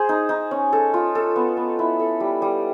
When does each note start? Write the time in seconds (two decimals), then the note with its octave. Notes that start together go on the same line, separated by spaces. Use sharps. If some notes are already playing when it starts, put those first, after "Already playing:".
Already playing: G#4 C5
0.09 D#4
0.29 D#4
0.51 C#4
0.73 A4
0.94 F4
1.15 A4
1.36 B3
1.57 B3
1.79 E4
2.00 A4
2.20 G3
2.42 G3